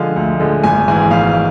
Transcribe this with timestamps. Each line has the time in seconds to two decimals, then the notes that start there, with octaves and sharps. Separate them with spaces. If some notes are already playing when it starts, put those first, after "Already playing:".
Already playing: D3 F3 G#3 F5 G#5
0.16 D2
0.40 D3 F3 G#3
0.64 G#1 G#5
0.87 G#2 E3 G#3 G#5
1.11 G#1 F5